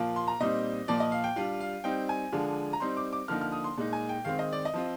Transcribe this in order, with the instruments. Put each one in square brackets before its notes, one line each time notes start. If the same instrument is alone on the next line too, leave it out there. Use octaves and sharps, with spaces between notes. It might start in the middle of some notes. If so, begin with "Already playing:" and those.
Already playing: [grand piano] A#2 F3 A#3 F4
C6
A#5
A#2 G3 C4 D#4 D#5
A#2 F3 A#3 D5
D#5
F5
G5
G3 D4 F4 F5
F5
G3 C4 D#4 G5
G#5
D3 F3 G#3 D4 F4
A#5
G3 C4 D#4 C6
D6
D6
D3 F3 A#3 D#4 F6
F6
D#6
C6
A#2 G#3 D#4
G#5
G5
D#3 G#3 C4 F5
D#5
D5
D#5
F3 C4 F4